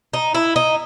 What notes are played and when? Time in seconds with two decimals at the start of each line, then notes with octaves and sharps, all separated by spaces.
0.13 D#4
0.34 E4
0.56 D#4